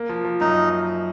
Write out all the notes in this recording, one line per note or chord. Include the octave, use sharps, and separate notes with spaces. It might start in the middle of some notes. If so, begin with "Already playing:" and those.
Already playing: A#3
F3
F3
F#2 D#4